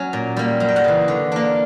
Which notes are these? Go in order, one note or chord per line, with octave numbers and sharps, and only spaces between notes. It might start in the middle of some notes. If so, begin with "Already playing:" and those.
Already playing: F#3 C#4
A#2
G3 A#3
F#2 A#5
G5
F#5 A#5
C#3 E3
D3
A#3 D4